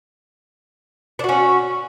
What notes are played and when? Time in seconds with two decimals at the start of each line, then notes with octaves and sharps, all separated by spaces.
1.19 D4
1.24 F#4
1.29 C#4